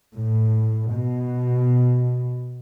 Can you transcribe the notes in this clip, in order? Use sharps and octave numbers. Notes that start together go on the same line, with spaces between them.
A2
B2